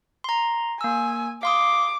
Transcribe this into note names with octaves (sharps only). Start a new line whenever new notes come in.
A#5 C6
A#3 G#5 E6
F5 C6 D6 D#6